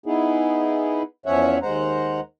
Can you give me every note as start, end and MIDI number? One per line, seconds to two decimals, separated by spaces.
0.06 1.02 59
0.06 1.02 63
0.06 1.02 64
0.06 1.02 68
1.26 1.58 40
1.26 1.58 53
1.26 1.58 61
1.26 1.58 73
1.26 1.58 76
1.26 1.58 78
1.62 2.20 39
1.62 2.20 56
1.62 2.20 72
1.62 2.20 78
1.62 2.20 82